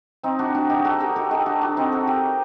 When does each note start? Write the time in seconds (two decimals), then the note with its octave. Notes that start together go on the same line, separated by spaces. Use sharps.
0.23 C4 D#4
0.39 D4 F#4
0.54 D4 F#4
0.70 D#4 G4
0.85 F#4 A4
1.00 G4 A#4
1.16 F#4 A4
1.31 D#4 G4
1.46 D4 F#4
1.61 D4 F#4
1.77 C4 D#4
1.92 F#4 A4
2.07 G4 A#4